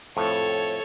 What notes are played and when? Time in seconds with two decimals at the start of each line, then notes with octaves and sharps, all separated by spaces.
0.17 F2 A2 A4 C#5